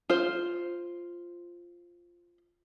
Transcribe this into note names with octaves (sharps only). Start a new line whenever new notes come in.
F4 C5